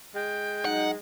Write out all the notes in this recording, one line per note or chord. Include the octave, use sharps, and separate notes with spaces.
G#3 G5
F#3 D#4 F#5